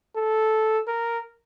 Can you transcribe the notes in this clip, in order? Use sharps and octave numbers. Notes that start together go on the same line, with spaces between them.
A4
A#4